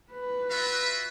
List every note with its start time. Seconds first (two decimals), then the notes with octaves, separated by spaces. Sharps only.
0.12 B4
0.51 F4 F#4 E5